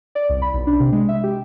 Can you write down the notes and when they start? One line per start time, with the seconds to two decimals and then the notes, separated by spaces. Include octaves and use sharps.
0.15 D5
0.29 C2
0.42 B5
0.54 B1
0.67 D4
0.80 C3
0.92 G#3
1.09 E5
1.24 G4